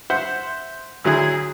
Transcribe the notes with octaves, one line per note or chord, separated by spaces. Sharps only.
C5 E5 F#5
D2 F#3 E4 G#4